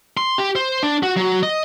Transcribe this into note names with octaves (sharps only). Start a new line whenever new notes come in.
C6
G4
C5
D4
F#4
F#3
D#5